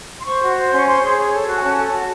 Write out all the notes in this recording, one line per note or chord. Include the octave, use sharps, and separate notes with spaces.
C6
C5 C#6
F#4
C5
C#4 C6
C#6
C5 C6
G#4
C#5
A4
F#4
G#5
C#4 A5
A4
F#4